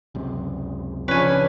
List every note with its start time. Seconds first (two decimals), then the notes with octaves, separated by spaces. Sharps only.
0.15 C#2 F#2 C3
1.08 C#3 F3 C#4 D4 F4 B4 G#5